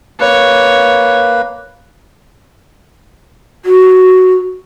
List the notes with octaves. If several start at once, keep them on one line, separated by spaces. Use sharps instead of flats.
A#3 B4 C#5
F#4